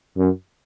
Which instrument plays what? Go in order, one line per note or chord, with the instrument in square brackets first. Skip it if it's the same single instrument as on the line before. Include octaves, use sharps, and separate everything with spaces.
[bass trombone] F#2